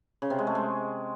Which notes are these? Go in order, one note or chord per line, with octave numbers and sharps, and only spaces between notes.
C#3
C3
G#3
A3
G#3